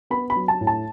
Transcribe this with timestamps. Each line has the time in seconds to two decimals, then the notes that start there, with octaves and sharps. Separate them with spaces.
0.10 B3 B5
0.30 B5
0.36 F#3
0.48 A5
0.61 A2
0.67 A5